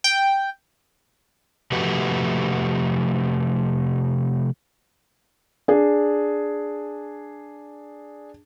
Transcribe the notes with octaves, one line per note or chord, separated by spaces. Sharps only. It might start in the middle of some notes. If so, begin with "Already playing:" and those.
G5
C3 F3 A3 F#4 G4 B4
D4 G#4